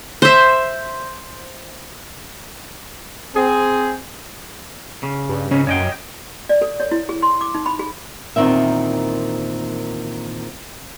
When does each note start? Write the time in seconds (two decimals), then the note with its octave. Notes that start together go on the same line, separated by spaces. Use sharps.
0.22 C5 E5
3.35 C4 G#4
5.03 C#3
5.29 G2
5.51 C#2 G#2 C#3 C#4
5.67 F#2 C#5 D#5 G5
6.49 D5
6.61 A4
6.80 C#5
6.91 E4
7.09 G#4
7.22 C6
7.41 D6
7.54 D#4
7.66 B5
7.79 G#4
8.36 E2 A#2 D#3 C4 E5